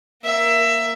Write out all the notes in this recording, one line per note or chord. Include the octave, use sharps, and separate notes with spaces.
A#3 E5